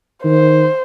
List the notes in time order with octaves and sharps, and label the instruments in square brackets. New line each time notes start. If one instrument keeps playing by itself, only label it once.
[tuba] D#3 [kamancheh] C5